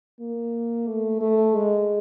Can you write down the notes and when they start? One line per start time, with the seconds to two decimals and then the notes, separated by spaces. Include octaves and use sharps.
0.20 A#3
0.87 A3
1.21 A3
1.55 G#3